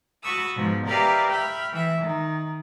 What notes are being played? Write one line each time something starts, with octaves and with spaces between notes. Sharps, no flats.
F#4 A5 B5 C#6 D#6 E6
G#2 B2 F3
G4 A#4 B4 D5 E5 F5
E5 G5 B5 F6
E3 E5
D#3